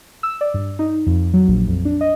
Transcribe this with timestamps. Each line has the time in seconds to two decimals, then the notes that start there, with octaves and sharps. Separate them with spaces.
0.23 E6
0.41 D5
0.54 G2
0.79 D#4
1.07 F2
1.34 F#3
1.48 A#1
1.68 F2
1.85 D4
2.01 D#5